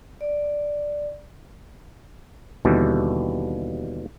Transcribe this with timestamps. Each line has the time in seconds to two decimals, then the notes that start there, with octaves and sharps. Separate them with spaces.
0.21 D5
2.65 D#2 B2 D3 E3 G3